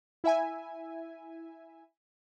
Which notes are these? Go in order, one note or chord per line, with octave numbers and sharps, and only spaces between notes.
E4 E5 G#5